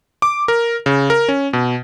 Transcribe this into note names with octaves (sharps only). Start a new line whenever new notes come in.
D6
A#4
C#3
A#4
C#4
B2